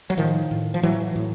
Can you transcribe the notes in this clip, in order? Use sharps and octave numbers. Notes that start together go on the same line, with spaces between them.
F#3
A2 D#3 F3
A2
F3
A2 E3 F#3
A2